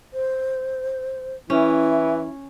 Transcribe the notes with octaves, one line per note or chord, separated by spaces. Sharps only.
C5
E3 C#4 E4